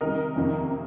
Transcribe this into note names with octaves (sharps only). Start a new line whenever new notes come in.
C3 D#3 G3 A#4 D#5
F2 C3 D#3 A#3